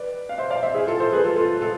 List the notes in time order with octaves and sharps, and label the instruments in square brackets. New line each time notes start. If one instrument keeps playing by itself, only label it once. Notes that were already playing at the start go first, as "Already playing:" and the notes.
Already playing: [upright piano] B4 D5
F5
C5 E5
D5 F5
C5 E5
E4 G#4
F4 A4
A4 C5
G#4 B4
F4 A4
F4 A4
F4 A4